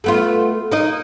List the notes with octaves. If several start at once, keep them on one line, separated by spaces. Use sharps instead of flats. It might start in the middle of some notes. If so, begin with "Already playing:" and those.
A3 B3 F4
A#3 D#4 D#5